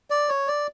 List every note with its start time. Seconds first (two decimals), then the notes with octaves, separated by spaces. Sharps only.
0.10 D5
0.29 C#5
0.48 D5